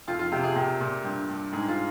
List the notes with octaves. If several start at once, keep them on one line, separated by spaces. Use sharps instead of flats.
F2 F4
F4
C3 G4
G#4
A#2 G4
A#2
G2
G2
G#2 G#4
F4